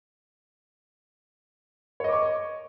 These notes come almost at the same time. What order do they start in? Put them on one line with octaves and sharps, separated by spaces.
C#5 D#5 D6 C#6